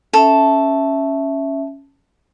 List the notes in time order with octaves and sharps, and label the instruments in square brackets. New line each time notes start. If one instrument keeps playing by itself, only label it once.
[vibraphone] C#4 E5 [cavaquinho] A4